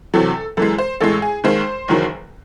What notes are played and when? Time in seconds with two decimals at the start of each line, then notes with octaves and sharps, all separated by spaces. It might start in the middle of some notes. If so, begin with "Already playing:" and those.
0.14 E2 C3 F#3 A4
0.57 F#2 E3 G#3 A4
0.78 C5
1.00 A1 A2 G#3 A4
1.22 G#4
1.44 D#2 D#3 G#3 C5
1.88 F#1 E2 D#3 F#3